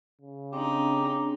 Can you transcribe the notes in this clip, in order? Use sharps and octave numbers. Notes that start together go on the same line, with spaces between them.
C#3
C4 D4 D#4 G4